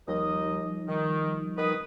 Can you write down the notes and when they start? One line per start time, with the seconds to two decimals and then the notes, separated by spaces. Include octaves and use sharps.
0.08 D#2 F3 G3 D#4 D#5
0.89 D#3
1.58 D#3 B4 D#6